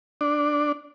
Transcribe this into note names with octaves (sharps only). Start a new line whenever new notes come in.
D4